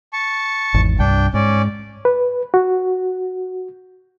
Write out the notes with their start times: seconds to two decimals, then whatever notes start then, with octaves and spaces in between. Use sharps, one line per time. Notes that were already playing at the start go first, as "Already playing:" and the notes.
0.13 A5 C#6
0.74 G#1 E2
0.99 C2 G2 D4 G5
1.34 G#2 C#4 D5
2.05 B4
2.54 F#4